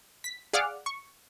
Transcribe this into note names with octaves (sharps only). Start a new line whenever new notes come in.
B6
G#4 D5 F5 F#5 D6 F6
C#6